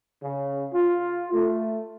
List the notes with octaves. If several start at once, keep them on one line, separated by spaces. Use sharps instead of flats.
C#3
F4
A3